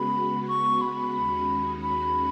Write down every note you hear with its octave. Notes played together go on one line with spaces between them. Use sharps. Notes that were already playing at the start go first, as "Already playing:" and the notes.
Already playing: C#3 G#3 B3 F#4 B5
C#6
B5
D#2 D#3 G#3 C#4 F#4
B5